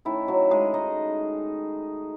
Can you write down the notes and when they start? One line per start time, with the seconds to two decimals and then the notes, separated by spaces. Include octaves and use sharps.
0.05 D#3 A3 C#4 E4
0.28 F#3 F#4
0.51 G#3 G#4
0.74 D#4 D#5